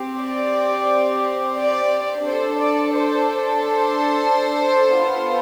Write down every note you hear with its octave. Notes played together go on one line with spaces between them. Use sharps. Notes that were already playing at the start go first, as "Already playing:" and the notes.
Already playing: C4 G4
D5
D5
D4 A4 C5
D5
C5
C5
B3 F4 A4